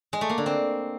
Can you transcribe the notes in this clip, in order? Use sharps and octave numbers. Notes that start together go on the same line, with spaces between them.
G#3
A3
A#3
D3
C4